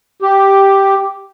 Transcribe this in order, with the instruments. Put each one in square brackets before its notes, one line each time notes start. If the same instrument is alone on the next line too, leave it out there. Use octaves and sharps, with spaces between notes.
[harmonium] G4